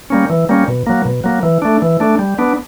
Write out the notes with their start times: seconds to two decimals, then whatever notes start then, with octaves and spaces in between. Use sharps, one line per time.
0.10 G3 A#3 C#4
0.30 E3
0.49 G3 A#3 C#4
0.68 B2
0.87 F#3 A#3
1.05 B2
1.24 F#3 A#3
1.43 E3
1.62 A3 D4
1.82 E3
2.00 A3 D4
2.19 G3
2.38 B3 D4